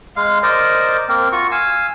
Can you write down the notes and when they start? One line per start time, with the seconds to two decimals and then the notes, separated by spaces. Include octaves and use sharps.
0.16 G#3 F5
0.43 A#4 C5 D5 D#5
1.08 A#3 C4 A#4
1.32 F4 F#4 C#6
1.51 F5 G#5 E6